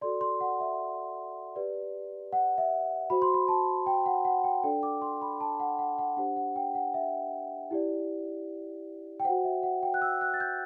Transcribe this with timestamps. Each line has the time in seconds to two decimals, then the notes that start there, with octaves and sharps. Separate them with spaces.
0.01 F#4 A4 D5 C6
0.21 C6
0.41 F#5
0.60 E5
1.56 G4 B4 D5
2.33 F#5
2.58 E5
3.10 F#4 C5 B5
3.22 C6
3.34 B5
3.48 A5
3.86 G5
4.06 F#5
4.25 F#5
4.44 G5
4.64 D4 A4 D5 G5
4.83 D6
5.02 C6
5.22 B5
5.41 A5
5.60 F#5
5.79 F#5
5.99 F#5
6.17 D4 G4 C5 F#5
6.37 F#5
6.56 G5
6.75 F#5
6.94 E5
7.71 E4 G4 D5
9.20 G5
9.25 F#4 C5 F#5
9.44 E5
9.63 F#5
9.83 G5
9.94 F#6
10.02 E6
10.21 F#6
10.34 A6
10.40 G6